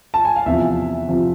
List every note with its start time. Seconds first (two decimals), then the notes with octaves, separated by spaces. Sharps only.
0.14 A5
0.25 G#5
0.36 F5
0.46 E2 C3 F3 E5
1.09 C3 F3